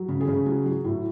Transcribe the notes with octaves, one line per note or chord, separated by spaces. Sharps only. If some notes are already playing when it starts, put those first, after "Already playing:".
Already playing: F#3
C#3
G#4
C#3
F#3
F#3
A2